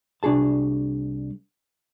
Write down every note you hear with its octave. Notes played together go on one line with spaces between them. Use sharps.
C2 D4 F#4 G#4 A5